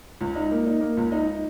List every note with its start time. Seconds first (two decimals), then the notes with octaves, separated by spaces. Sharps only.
0.21 C#2
0.35 D#4
0.52 A#3
0.66 D#4
0.81 A#3
0.97 C#2
1.12 D#4
1.27 D#4